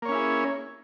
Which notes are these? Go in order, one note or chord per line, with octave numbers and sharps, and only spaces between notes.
A#3 C#4 E4 G#4 C#5